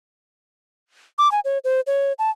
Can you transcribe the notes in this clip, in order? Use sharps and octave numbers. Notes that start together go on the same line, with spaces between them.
D6
G#5
C#5
C5
C#5
A5